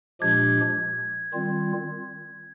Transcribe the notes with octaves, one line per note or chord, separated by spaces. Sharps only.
A#2 F3 G#3 D4 G4 G#6
D#3 G3 C4 F4